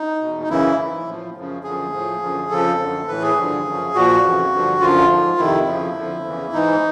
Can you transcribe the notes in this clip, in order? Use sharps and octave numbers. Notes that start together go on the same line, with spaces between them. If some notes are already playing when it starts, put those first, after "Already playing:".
Already playing: D#4
E2 B2
D#4
F#2 C#3 E3 E4
G#2 E3
A2 F3
F#2 C#3 F3
F#2 D3 F3 G#4
A2 F3
F#2 D3 F3
F2 C#3 F3 A4
F#2 D3 F3
A2 E3 B4
G#4
G2 D3 F3
F#2 C#3 F3
A#2 F3 F#4
F2 C#3 E3
G2 D3 F3
F#2 D3 F3 F4
G#2 F3
F2 C3 D#3 E4
F2 C#3 F3
F2 D3 F3
E2 C#3 E3
G#2 E3 D#4